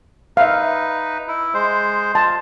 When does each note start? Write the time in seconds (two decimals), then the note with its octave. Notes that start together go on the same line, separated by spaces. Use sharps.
0.37 D#4 B4 E5 F5
1.28 E4
1.54 G#3 C5
2.15 F4 A5